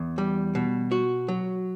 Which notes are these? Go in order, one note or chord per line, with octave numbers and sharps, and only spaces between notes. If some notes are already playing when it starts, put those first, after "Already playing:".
Already playing: E2
G3
B2
F#4
F#3